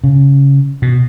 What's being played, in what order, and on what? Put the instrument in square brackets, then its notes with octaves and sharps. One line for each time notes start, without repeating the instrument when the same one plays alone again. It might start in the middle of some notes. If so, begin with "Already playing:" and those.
[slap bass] C#3
B2